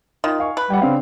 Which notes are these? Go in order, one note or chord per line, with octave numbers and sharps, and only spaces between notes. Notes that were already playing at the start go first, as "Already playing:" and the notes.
D#3 F4
F5 G#5 C#6
B4
G3 F#5 G5
C#3 C4 D4 F5